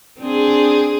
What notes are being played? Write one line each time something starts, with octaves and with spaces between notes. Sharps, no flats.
C4 D4 G#4